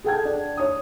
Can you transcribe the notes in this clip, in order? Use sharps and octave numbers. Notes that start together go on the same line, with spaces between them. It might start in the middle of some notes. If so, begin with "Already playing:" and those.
G#4 A4 F#5 G5 A5 G#6
D4
C#5 D#6